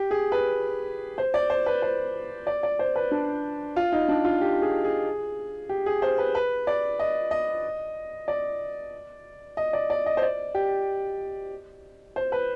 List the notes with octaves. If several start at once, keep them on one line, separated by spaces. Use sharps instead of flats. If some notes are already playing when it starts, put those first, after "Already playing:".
Already playing: G4
G#4
B4
C5
D5
C5
B4
C5
D5
D5
C5
B4
D4
F4
D#4
D4
F4
G4
G#4
G#4
G4
G#4
C5
B4
B4
D5
D#5
D#5
D5
D#5
D5
D5
D#5
C5
D5
G4
C5
B4